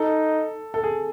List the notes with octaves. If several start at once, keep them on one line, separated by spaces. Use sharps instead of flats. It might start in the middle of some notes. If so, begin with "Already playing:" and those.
Already playing: D#4 A4
A4
G#4